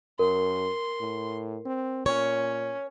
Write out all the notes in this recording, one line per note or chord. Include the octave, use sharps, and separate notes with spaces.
F#2 A#4 C6
A2
C4
A#2 C#4 C#5